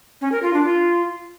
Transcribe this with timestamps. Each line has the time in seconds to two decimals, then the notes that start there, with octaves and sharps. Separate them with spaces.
0.21 C#4
0.32 A#4
0.42 F4
0.53 D4
0.64 F4